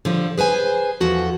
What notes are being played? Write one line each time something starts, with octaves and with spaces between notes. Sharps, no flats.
D3 F3 G3
G#4 B4 C5 G#5
E2 F3 F#4 A4